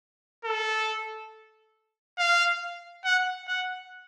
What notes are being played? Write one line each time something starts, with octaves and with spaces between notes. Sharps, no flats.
A4
F5
F#5
F#5